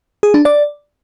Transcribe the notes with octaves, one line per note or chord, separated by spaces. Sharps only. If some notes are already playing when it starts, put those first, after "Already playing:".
G#4
D4
D5